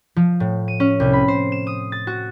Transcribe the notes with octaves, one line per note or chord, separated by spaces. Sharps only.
F3
A2
D#7
C#4
C2
B5
C5
E7
D#6
A6
F#4